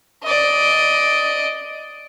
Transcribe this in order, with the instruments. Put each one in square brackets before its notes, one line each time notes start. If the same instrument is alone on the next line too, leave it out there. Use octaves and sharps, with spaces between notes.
[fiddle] D5 D#5